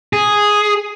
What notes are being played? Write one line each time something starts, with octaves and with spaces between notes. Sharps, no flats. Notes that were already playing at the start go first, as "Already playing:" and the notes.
G#4